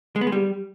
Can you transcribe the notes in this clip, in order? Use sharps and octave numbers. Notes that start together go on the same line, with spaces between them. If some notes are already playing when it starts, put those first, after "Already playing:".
G#3
B3
G#3
G3